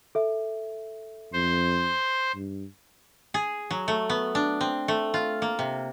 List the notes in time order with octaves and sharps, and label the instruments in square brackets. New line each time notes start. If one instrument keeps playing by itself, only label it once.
[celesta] A4 E5
[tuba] F2 [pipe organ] C5
[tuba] G2
[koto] G#4
F#3
A3
B3
D4
C4
A3
F4
A#3
C3